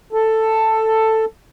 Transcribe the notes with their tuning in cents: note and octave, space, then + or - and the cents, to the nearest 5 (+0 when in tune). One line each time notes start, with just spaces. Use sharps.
A4 +10